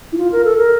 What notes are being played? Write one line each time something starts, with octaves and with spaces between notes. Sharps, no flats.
E4
F4
A#4
A4
A#4